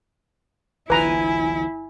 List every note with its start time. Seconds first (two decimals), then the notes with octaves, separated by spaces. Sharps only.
0.90 G1 C#2 D#3 F3 E4 B4 G#5 A#5